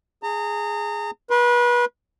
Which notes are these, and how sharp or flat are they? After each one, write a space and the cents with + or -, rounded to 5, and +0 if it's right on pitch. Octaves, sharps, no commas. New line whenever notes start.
G#4 +0 A#5 -35
B4 -30 C6 +0